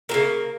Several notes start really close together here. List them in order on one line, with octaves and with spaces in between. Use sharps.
F#3 A3 A#3 C#3